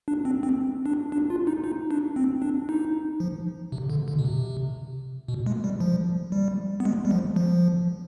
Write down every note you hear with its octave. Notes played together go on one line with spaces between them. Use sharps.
D4
C4
C4
D4
D4
F4
D#4
D#4
D4
C4
D4
D#4
F3
C3
D3
D3
B2
C3
B2
G#3
G3
F3
G3
B3
G#3
G3
F3
F3